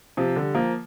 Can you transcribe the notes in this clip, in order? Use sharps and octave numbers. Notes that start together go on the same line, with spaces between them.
C3 F3
D3 G3
F3 A#3